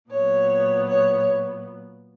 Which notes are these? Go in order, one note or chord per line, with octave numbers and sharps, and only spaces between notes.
A#2 F#3 B3 C#5
C#5